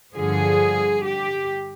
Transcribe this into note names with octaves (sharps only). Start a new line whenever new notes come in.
G2 D3 F3 G#4
G4